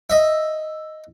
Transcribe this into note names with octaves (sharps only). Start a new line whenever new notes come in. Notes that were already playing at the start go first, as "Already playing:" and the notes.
D#5 E5